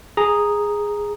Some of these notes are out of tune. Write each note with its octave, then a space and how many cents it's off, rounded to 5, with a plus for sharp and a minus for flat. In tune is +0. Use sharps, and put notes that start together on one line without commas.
G#4 -5 A#5 +0